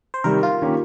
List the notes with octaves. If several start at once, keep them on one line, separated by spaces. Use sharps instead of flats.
C5
C3 D#3 G3 A#4
F4
D#3 A#3 C#4 G4